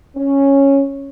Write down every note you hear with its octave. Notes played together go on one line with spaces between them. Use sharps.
C#4